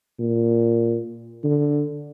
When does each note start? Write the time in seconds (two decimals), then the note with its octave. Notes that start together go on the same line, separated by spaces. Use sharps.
0.19 A#2
1.44 D3